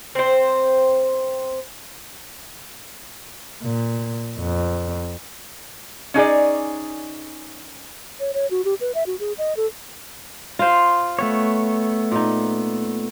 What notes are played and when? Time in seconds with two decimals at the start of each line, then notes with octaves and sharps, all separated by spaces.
0.15 C4 C5
3.63 A#2
4.39 F2
6.14 C#4 D#4 G#4 D5
8.20 C#5
8.34 C#5
8.51 F#4
8.65 G4
8.81 B4
8.95 E5
9.07 F#4
9.19 G#4
9.38 D#5
9.57 A4
10.59 F4 C5
11.19 A3 B3 C#5
12.12 A#2 D#4